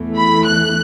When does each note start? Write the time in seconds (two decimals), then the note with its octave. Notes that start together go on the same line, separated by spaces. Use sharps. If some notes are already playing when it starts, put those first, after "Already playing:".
Already playing: E2 E3 A3
0.16 B5
0.46 F#6